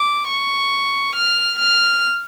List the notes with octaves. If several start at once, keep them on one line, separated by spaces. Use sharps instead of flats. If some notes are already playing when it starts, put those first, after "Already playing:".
Already playing: D6
C#6
F6
F6